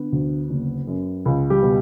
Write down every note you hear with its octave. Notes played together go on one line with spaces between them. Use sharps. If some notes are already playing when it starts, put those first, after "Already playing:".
Already playing: D3 B3
D2
F#1
F#2
C#2
G3 G4
B2